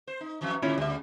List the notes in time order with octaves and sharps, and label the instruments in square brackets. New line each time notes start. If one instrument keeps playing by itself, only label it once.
[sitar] C5
D#4
F2 E3 F#3
[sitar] A2 D3 G3 [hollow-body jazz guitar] C#4 E4 F4
[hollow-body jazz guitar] D2 E5 [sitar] C#3 G3